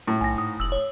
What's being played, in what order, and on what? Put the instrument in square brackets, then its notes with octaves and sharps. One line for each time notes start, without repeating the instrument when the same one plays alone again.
[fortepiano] A2
[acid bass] B1 [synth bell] G#5 A#6
[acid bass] G#2 [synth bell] D#6
[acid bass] F1 [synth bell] E6 F#7
[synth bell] C#5